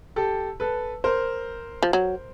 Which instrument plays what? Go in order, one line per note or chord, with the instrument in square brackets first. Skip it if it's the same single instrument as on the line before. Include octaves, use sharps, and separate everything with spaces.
[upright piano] G4 A4
A4 B4
A#4 C5
[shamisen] F3
F#3